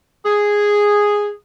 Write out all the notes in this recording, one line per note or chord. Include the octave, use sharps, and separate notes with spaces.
G#4